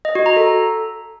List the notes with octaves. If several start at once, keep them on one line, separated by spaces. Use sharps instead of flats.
D#5
F#4
A#5
A4